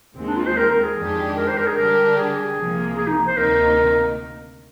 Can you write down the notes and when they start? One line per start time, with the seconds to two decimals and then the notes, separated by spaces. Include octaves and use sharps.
0.17 D#2 D#3 G#3 C4
0.27 D4
0.37 F4
0.47 C5
0.57 A#4
0.71 A#4
0.83 G#4
0.97 F2 D#3 G#3 D4 G4
1.37 A#4
1.47 C5
1.57 A#4
1.67 G#4
1.77 D3 G3 D4 G4 A#4
2.17 G#4
2.57 C2 C3 F3 A#3
2.97 G#4
3.08 D#4
3.27 C5
3.37 D2 C3 D#3 A#3 D#4 A#4